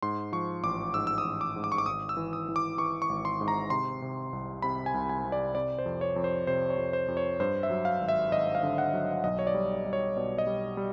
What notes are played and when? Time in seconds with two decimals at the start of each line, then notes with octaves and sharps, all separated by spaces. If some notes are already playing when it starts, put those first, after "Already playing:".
0.02 G#2 C6
0.32 F3 C#6
0.63 A1 D6
0.94 G#2 E6
1.07 E6
1.18 D#6
1.25 A1
1.41 D6
1.56 G#2
1.64 D6
1.72 C#6
1.78 D6
1.86 G#1 D#6
2.09 E6
2.17 E3
2.33 D#6
2.49 E3
2.56 D6
2.78 E3 C#6
3.02 C#6
3.09 G#1
3.25 C6
3.41 G#2
3.48 A#5
3.70 C3 C6
4.02 C3
4.33 C2
4.62 C3 B5
4.86 G#5
4.94 C2
5.09 G#5
5.25 C3
5.32 D5
5.55 C3 D5
5.79 C5
5.86 F2
6.01 C#5
6.16 F2
6.24 C5
6.47 C3 C5
6.70 C#5
6.78 F2
6.93 C5
7.08 F2
7.17 C#5
7.40 G2 C5
7.63 E5
7.70 F#3
7.85 F5
8.01 G#1
8.08 E5
8.31 G#1 D#5
8.55 F5
8.63 D3
8.78 F#5
8.93 F#3
9.23 B1 D#5
9.39 C#5
9.47 D5
9.54 G3
9.86 G3
9.93 C#5
10.17 B2 D5
10.38 D#5
10.47 G3
10.77 G3